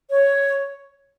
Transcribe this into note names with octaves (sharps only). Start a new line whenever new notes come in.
C#5